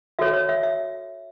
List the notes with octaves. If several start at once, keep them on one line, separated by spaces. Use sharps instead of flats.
F#4 A4 C#5 E5
C#5
E5
E5